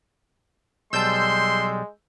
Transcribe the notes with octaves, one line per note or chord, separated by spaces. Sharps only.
B1 G3 G#3 A5 C6 E6 G6